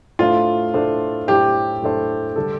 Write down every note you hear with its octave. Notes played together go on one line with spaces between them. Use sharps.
A2 A3 D4 F4 A4 C5
A2 A3 D4 A4 C5
A2 A3 D4 G4 A4 C5
A2 A3 D4 A4 C5
D3 G3 D4 A4